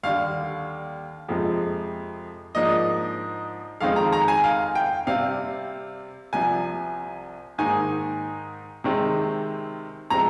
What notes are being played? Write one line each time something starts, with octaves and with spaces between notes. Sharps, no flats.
D#2 D3 G3 F5
F2 C3 F3 G#3
G#2 F3 A#3 D4 D#5
F2 D#3 G#3 C4 D#4 F5
A#5
A#5
G#5
F5
G5
C3 G3 C4 F5
C2 C3 F3 G#5
G#2 D#3 A#3 D#4 G#5
C3 D#3 G#3 C4
C3 F3 G#3 C4 A#5